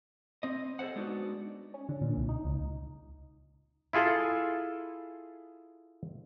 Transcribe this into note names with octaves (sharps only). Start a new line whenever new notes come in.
C4 D#5
G#4 A4 B4 C5 F#5
G#3 B3 D4 D#4 F#4
C#4
D3
A#2
C2
D#4
C#2
E4 F4 G#4 A4